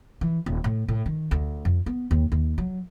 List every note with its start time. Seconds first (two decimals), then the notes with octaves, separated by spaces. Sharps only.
0.21 E3
0.46 D#1
0.64 A2
0.88 A2
1.06 D#3
1.31 D2
1.65 F2
1.86 B3
2.11 D#2
2.32 D#2
2.58 F#3